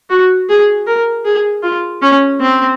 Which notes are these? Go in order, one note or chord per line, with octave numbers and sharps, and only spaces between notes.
F#4
G#4
A#4
G#4
F4
C#4
C4